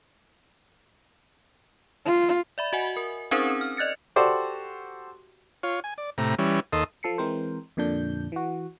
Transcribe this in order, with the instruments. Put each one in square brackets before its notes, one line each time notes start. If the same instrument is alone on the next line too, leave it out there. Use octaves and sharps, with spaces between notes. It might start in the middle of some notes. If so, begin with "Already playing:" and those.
[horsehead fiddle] F4
[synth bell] D5 E5 B5
F#4 D#5 F#5 G#5
A#4
C4 C#4 D#4 G#4 A#4 C5
F6
D5 D#5 F#6 A6 C#7
[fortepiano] F#4 G4 A4 C5 D5
[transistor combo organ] F4 C#5
G#5
D5
A2 C3 A#5
E3 G3 C#4
D#2 A4 D#5 C6
[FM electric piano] F3 A4 C7 C#7
E3 G#3 C4 A#4 C5
F2 A#2 D3 D4 G6
E3 F#4